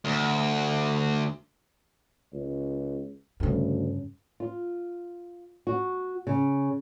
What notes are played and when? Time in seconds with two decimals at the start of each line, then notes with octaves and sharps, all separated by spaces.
0.05 D2
2.33 C#2
3.40 D2 G2 C#3
4.40 F4
5.67 F#4
6.27 C#3